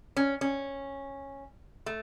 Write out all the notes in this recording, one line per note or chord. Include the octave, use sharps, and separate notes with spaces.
C#4
C#4
A3